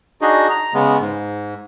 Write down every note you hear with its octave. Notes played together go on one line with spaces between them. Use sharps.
D4 D#4 F#4 G#4 D#5
A#5
C#3 G#3 B3
G#2